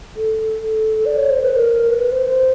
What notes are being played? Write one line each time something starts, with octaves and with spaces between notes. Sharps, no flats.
A4
D5
C#5
C5
B4
A#4
B4
B4
C5